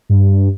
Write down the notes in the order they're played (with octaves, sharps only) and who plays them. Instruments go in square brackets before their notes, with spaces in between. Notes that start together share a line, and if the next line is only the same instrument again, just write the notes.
[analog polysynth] G2